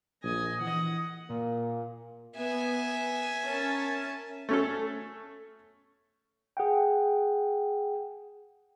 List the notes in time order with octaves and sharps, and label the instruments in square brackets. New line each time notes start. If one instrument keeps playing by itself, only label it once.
[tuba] A#1 [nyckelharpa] D#5 G#5
[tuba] E3 [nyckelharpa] D#5 F#5
[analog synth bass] A#2 [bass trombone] A#3
[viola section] B3 [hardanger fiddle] E5 G#5
[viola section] C#4 A#4 A5
[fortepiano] A3 C#4 A4
[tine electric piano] G#4 F#5 G5